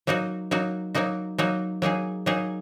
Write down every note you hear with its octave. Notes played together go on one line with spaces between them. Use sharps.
F#3 A#3 D#4 F#4
F#3 A#3 D#4 F#4
F#3 A#3 D#4 F#4
F#3 A#3 D#4 F#4
F#3 A#3 D#4 G#4
F#3 A#3 D#4 G#4